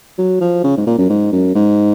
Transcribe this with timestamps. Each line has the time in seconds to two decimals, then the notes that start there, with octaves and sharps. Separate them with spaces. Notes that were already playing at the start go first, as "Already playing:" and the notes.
0.18 F#3
0.41 F3
0.64 C#3
0.77 G#2
0.87 A#2
0.98 F#2
1.09 G#2
1.32 F#2
1.55 G#2